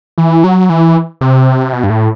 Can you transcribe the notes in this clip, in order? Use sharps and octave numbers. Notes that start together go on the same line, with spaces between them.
E3
F#3
E3
C3
B2
G2
A2